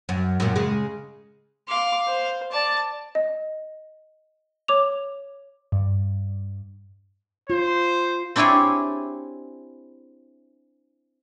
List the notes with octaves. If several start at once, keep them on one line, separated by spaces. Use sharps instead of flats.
F#2
F#2 A#2
C#3 G#3
F5 C6 D6
C5
D5 A5
D#5
C#5 D6 F7
G2
F4 C5
C4 D4 E4 G4 G#4 C#5